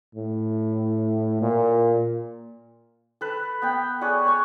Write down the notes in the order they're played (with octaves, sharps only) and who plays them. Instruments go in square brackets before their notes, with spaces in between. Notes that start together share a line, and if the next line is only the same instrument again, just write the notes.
[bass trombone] A2
A#2
[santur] A4 B4
B3 G5
G#4 C#5 D5 F#5
C#5 C#6